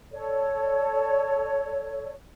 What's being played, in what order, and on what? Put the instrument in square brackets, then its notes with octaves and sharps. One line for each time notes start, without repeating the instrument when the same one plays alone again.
[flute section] A4 C#5 D5